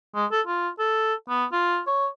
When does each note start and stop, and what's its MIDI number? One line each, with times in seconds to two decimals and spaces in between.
0.15 0.26 56
0.32 0.41 69
0.47 0.69 65
0.79 1.14 69
1.29 1.45 59
1.52 1.80 65
1.87 2.07 73